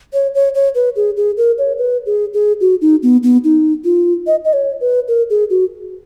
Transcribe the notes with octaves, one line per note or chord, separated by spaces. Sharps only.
C#5
C#5
C#5
B4
G#4
G#4
A#4
C#5
B4
G#4
G#4
F#4
D#4
B3
B3
D#4
F4
D#5
D#5
C#5
B4
A#4
G#4
F#4